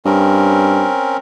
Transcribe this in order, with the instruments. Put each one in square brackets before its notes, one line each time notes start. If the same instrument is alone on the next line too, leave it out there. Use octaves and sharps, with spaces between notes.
[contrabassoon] G2 [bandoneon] C4 C#4 A#4